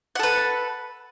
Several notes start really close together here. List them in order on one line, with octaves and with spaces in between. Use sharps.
F#5 A4 B4